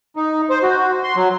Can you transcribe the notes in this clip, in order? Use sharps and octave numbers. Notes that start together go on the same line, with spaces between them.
D#4
C5
F#4
C6
F#3